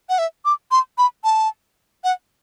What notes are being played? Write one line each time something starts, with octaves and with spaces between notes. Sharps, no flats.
F#5
E5
D6
C6
B5
A5
F#5